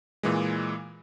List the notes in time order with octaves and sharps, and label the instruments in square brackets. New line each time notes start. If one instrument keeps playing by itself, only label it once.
[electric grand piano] A#2 E3 G#3